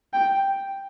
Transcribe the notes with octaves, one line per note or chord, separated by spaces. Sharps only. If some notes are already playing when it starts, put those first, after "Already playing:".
G5